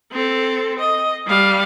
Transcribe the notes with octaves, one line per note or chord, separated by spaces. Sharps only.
C4 A4
D#5
G3 F5